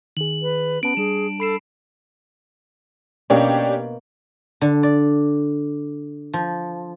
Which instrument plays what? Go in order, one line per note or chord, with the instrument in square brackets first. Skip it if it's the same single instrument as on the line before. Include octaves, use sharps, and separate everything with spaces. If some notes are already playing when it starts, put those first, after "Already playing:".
[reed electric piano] D#3 G#4 [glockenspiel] F#7
[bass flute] B4
[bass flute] B3 [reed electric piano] C#4 [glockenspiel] A5 D7
[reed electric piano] G3 D4 [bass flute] G#4 [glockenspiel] E7
[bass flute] A4 [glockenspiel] B5 C7 E7
[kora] B2 A#3 [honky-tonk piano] C#4 D4 G4
[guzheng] D3
D5
F3